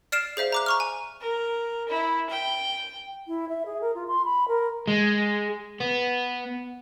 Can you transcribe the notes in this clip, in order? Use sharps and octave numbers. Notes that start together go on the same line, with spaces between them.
D5 F6 C7 D7 E7
G#4 C5 E5 F5
A#5 D6 F#6
A#5 C#6 F6
G#5
A#4
E4
G5
E4
E5
G#4
A#4
F4
C6
B5
A#4
G#3
B3